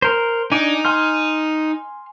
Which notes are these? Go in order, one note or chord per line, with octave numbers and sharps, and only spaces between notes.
A#4 C5
D4 D#4 D5 G#5
G#5 C6 F6